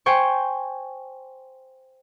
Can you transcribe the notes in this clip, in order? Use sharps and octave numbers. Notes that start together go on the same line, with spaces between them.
C5 G5 G#5 C#6